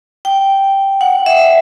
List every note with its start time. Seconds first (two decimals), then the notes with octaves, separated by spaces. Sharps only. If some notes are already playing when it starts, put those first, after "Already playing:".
0.25 G5
1.01 F#5
1.26 E5